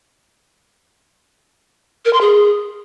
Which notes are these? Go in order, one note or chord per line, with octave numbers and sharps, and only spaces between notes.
A#4
C6
G#4